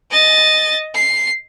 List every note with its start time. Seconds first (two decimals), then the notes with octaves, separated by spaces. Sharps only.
0.11 D#5 A6
0.95 C7